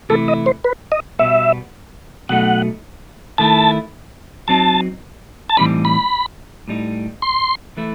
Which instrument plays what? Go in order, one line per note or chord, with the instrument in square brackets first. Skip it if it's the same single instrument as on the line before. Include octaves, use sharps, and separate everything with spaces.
[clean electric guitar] C3 E3 A3 E4 [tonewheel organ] A4
[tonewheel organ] D#5
C5
B4
D#5
[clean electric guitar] B2 G3 B3 [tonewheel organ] E5
[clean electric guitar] B2 F#3 A3 D#4 [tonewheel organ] F#5
[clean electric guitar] D#3 A3 E4 [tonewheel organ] A5
[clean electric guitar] F#3 C4 D#4 [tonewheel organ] A5
[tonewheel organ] A5
[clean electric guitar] A2 E3 G3 C4 D#4 [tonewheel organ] B5
[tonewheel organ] B5
[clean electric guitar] A2 G3 D#4
[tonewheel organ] C6
[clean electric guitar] E3 A3 E4